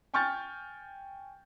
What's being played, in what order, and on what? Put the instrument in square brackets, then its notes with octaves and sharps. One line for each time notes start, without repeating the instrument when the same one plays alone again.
[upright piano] G5 G#5 C#6 F6 G6 A6